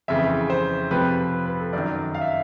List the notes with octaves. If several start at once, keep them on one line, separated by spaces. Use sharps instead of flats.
F2 C#3 E3 E5
C5
F2 C3 F3 B4
B4
B4
A4
F#2 D#3 D5
F5
E5